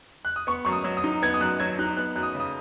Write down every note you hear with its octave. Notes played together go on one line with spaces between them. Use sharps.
F#6
D#6
B3 C#6
F#2 C#6
D#6
F#3
D#6
D#4
B3 G#6
D#6
F#2 F#6
F#3 G#6
D#4 F#6
B3 F#6
F#2 F#6
D#6
C#3
D#6